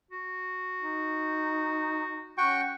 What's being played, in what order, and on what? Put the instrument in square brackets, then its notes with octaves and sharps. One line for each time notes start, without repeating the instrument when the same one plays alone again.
[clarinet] F#4
[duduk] D#4
[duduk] C#4 [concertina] F#4 G5 C#6